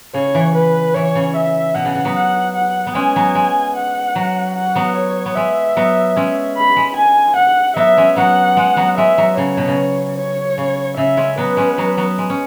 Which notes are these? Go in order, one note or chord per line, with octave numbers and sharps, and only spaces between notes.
C#3 C#5
E3
B4
E3 C#5
C#3
E5
B2 F#5
C#3
C#3
F#3 B3
F#5
F#5
B3
G#3 C#4 G#5
F#3 B3
G#3
F#5
F#3
F#5
F#3 B3
C#5
B3
G#3 E5
F#3 B3
G#3 C#4
B5
G#3
G#5
F#5
F#3 B3 E5
G#3 C#4
F#3 B3 F#5
G#3
F#3 B3
G#3 E5
F#3
C#3 C#5
B2
C#3
C#5
C#3
C#3 E5
G#3 C#4
F#3 B3 B4
G#3 C#4
F#3 B3
F#3 B3
G#3
C#4